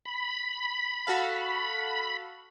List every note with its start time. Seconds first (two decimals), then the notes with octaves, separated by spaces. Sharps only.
0.05 B5
1.07 F#4 A4 F5